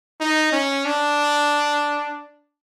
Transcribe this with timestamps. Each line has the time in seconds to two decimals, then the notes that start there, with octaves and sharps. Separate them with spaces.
0.20 D#4
0.52 C#4
0.85 D4